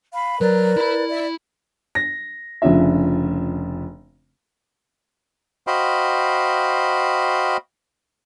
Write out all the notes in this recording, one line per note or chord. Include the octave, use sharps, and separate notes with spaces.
F5 B5
F#3 A#4 B4 D5
E4 B5
D5 E5
A#6
F1 C#3 D4 F4 E5
F#4 C5 D#5 F5 G5 B5